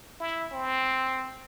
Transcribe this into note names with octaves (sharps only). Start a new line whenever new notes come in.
E4
C4